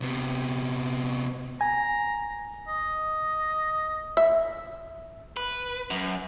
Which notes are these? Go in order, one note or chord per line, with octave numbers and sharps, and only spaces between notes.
C3 B3
G#5 A#5
D#5
E5
B4
F#2